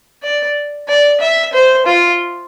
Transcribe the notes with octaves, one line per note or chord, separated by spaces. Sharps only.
D5
D5
E5
C5
F4